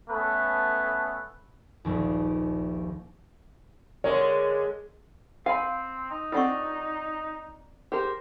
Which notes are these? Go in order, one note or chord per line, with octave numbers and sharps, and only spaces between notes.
A3 B3 C#4 A4 B4
D#1 A#1 D#2
D3 G#3 A#4 C#5
C4 F5 G#5 B5
D#4
C4 D4 F4 A4 F#5 C#6
G4 G#4 A#4 C5